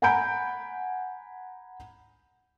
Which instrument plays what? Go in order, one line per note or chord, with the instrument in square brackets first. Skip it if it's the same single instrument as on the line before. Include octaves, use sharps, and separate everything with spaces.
[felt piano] F#5 G#5 A#5 B5 G6 D7